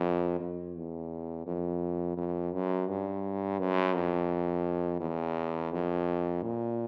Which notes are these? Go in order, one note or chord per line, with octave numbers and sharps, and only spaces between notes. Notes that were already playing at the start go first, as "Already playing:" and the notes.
Already playing: F2
F2
E2
F2
F2
F#2
G2
F#2
F2
E2
F2
A#2